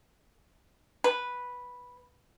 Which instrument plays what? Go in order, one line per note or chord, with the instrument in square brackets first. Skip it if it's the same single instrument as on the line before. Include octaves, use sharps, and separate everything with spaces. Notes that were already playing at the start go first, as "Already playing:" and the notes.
[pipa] B4